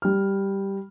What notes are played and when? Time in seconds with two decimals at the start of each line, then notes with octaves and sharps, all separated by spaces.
0.02 G3 F6